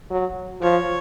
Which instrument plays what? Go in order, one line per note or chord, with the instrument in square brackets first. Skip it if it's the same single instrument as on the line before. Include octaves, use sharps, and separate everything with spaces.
[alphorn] F#3
[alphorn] F3 [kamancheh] C#5